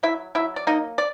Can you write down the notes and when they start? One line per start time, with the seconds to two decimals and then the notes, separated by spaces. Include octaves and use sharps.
0.03 F#3 E4 E5
0.35 F#3 E4 E5
0.56 D5
0.67 A#3 D#4 D#5
0.98 D5